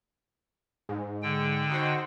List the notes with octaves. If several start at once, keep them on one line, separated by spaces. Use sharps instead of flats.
G#2
D3 G5
D#4 F#4 C5